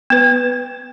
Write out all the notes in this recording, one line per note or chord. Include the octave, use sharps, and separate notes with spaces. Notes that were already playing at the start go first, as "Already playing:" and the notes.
B3 B4